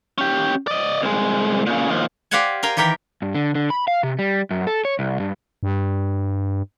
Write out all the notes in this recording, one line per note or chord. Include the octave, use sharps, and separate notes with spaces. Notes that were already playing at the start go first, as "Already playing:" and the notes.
C#4 G4
D5 D#5
C2 G#3
A#2 C#3
D#2 F3
G4 C5 D5 F5 F#5 G#5
A#4 F5 G5 G#5
D#3 E3 G4 A#4 G5
G2
D3
D3
B5
F5
C3
G3
F#2
A4
C#5
C2
G2
G2